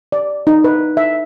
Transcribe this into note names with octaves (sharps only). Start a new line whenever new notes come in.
D5
D#4
B4
E5